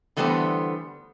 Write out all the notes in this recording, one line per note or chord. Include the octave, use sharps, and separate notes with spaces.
D3 E3 G3 A3 B3 C5